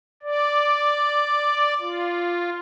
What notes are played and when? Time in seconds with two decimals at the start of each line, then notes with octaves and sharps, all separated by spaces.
0.23 D5
1.79 F4